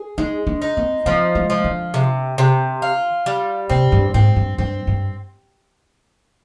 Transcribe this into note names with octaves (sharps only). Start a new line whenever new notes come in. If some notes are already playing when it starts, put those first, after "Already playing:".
Already playing: G#4
G#3 D#4
D4
D#4
C4
F3 C4
G#3
F3
D3
C3
C3
F4
G3
C3 C4
G2
G#2 C4
G2
G2 C4
G2